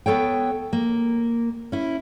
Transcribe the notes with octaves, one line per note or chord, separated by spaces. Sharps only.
B3 A4 C#5 G5
A#3
C#4 E4